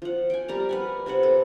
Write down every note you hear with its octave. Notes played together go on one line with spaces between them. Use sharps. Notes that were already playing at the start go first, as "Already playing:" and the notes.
F3 F#5
G5 G#5
G3 A#4 D5 A#5
B4 F#5 G#5
C3 C4 B4 F#5
A4